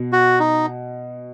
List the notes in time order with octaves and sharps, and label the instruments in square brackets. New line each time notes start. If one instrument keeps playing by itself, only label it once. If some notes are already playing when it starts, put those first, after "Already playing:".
Already playing: [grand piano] B2
[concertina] F#4
D#4